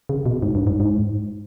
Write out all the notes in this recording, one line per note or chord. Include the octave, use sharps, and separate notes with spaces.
C#3
B2
G#2
G2
G#2
G#2